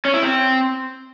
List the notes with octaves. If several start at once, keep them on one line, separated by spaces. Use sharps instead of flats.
C#4
E4
C4